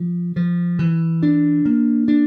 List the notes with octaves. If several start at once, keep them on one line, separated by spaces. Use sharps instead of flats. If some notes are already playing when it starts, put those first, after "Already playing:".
Already playing: F3
F3
E3
D4
A#3
D4